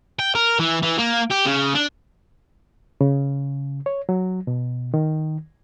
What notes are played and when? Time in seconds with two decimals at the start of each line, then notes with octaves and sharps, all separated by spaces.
0.19 G5
0.35 A#4
0.59 E3
0.82 E3
0.98 A#3
1.30 G4
1.45 C#3
1.75 D4
3.01 C#3
3.86 C#5
4.09 F#3
4.47 B2
4.94 D#3